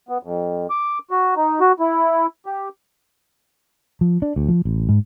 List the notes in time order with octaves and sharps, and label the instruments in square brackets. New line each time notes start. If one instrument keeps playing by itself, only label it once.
[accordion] B3
F2
D6
F#4
D#4
F#4
E4
G4
[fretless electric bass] F3
D4
D2
F3
A1
G#2